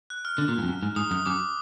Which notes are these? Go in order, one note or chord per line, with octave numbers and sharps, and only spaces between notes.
F#6
F6
D3
A#2
G#2
F2
F#2
G#2
G#2 D#6
F#2 D#6
F#2 D6